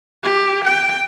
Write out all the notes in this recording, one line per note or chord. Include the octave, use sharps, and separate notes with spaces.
G4
G5